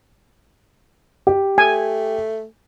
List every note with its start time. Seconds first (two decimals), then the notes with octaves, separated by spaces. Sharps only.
1.27 G4
1.58 A3 G#5